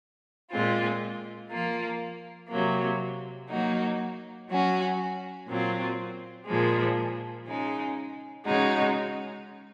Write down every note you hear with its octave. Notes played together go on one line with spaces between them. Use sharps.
A#2 G#3 C4 F4
F3 A#3 F4
C3 F#3 A#3
F#3 A#3 D#4 F#4
F#3 C#4 F#4
A#2 F#3 C4 F4
A#2 F3 G#3
C#3 G#3 D#4
C#3 G#3 D#4 F#4